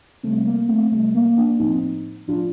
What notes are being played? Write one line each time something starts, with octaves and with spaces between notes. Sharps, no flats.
C3 G3 A3 C4
A#3
A3 C4
C3 G3 A3
A#3
A#3 D4
A2 F3 C4 D#4
A2 F3 D4 F4